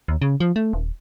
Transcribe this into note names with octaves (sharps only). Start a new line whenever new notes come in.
D#2
C#3
F3
A3
D#1